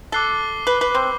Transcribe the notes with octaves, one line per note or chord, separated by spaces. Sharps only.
A4 D6 F#6 C7 G7
B4
B4
C4